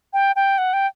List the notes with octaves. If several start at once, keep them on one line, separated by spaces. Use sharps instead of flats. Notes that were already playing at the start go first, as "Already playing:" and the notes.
G5
G5
F#5
G5